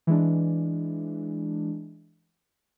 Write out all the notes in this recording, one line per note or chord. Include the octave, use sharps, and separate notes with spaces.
E3 G#3 D4